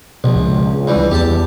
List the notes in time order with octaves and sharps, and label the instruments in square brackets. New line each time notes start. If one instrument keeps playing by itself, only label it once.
[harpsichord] A#1 [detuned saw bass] B2
[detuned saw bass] C#2
[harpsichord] G2 E3
[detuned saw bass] E2 [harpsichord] G4 A5